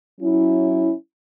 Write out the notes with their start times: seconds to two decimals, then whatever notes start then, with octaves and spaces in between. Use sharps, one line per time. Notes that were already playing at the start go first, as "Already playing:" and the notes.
0.20 F#3 C#4 E4